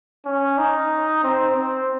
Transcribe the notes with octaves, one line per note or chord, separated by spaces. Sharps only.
C#4
D#4
C4
C4